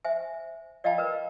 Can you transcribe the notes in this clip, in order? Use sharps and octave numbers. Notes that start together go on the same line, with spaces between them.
C5 E5 G#5
D5 D#5 F5 G5 A5 B5
A#4 B4